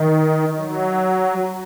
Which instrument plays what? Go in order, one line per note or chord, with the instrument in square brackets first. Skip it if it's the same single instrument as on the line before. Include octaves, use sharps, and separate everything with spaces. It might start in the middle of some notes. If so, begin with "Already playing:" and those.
Already playing: [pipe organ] D#3
F#3